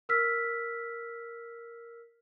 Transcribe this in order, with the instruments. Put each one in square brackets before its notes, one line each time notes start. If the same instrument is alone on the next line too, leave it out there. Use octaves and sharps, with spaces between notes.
[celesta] A#4 E6 F6 B6